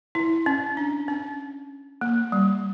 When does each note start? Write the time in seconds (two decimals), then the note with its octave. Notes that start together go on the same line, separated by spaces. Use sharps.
0.15 E4
0.46 C#4
0.77 D4
1.08 C#4
2.01 A#3
2.32 G3